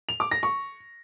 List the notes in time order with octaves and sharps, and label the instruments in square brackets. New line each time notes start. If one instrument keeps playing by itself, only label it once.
[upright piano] F7
D6
A#6
C#6